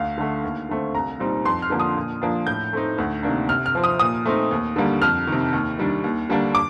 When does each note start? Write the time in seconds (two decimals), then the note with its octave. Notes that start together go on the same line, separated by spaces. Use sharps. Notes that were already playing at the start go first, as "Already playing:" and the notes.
Already playing: D2 F5
0.18 D3 A3
0.44 D#2
0.69 D3 A3 C4
0.95 C2 A#5
1.19 A#2 G3 C4 D#4
1.45 F2 C6
1.62 F6
1.70 D3 F3 A#3 D4
1.80 D#6
1.97 A#2
2.22 F3 A#3 D4
2.47 A2 G6
2.73 A3 C4 D#4
2.98 D2
3.23 C3 D#3 A#3 D4
3.49 C3 F6
3.66 F6
3.75 F3 C4
3.84 D#6
3.99 A#2 D#6
4.26 A3 C4 D#4
4.51 D#2
4.76 D3 G3 A#3
5.02 F2 F6
5.27 C3 D#3
5.53 D#2
5.78 D#3 G3 D4
6.04 D#2
6.29 D3 G3 A#3 D4
6.55 D6